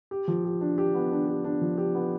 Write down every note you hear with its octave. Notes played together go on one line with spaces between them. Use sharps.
G4
F3
G4
D4
G4
B3
D4
G4
D4
F3
G4
B3